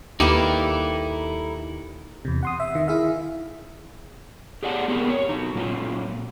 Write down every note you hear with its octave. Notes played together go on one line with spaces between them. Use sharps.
D#2 G3 A#3 D#4 E4 A4 B4
E2 C3
F#5 C6 D#6
E5
D#3 E5
E4 G#4 E5 F5
G4 G#4 D5 F#5 A5
B3 C4 G4 G#4 A#4
C#5
F#3 D#4
A#2 F#3 C#4 F4